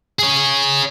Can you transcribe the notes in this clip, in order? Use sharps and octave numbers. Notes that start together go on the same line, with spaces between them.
G#4 C#5